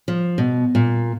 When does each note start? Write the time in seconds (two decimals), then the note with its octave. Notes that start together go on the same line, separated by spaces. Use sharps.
0.08 F3
0.38 B2
0.75 A#2